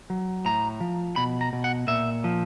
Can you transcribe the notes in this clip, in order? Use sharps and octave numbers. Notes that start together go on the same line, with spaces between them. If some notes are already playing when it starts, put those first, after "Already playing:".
F#3
A2 A#5
F3
B2 B5
A#5
B2
F#5
A#2 E5
F3